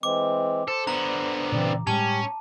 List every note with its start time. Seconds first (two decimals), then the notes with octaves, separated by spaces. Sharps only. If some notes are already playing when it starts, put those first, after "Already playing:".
0.03 E3 G#3 C4 D6
0.68 A4 C5
0.87 D3 B3 A#5
1.52 G2 A#2 C#3 E3 C4 D5
1.87 A2 G3 G#3 C#4 G4 A5